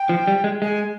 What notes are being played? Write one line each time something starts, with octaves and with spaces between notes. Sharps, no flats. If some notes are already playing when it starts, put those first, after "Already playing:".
Already playing: G5
F3
G3
G#3
G#3 G#5